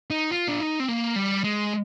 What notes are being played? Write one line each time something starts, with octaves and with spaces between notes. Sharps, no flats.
D#4
F4
D4
D#4
C4
A#3
G3
G#3